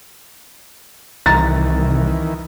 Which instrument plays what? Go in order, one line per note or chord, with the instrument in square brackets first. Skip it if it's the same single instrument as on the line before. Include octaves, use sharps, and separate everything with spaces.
[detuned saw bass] C2 [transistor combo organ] D#3 E3 [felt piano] A#5 A6